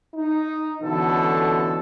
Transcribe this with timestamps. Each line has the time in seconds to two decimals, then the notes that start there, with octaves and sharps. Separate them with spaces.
0.15 D#4
0.81 C#2 B2 D3 E3 A4